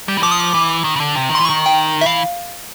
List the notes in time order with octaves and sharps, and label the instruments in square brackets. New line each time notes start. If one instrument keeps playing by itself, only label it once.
[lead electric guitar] G3
E3
[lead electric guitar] F3 [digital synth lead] D6
[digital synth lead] D#6
D6
[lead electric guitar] E3
D#3
C#3
D3
C3
D#3
[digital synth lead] C6
[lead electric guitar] E3
[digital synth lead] C#6
[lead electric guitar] D#3
[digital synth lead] G5
E5
[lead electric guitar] E3 [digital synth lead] F5